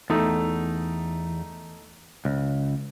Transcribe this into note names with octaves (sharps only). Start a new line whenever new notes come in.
E2 A3 D#4
C#2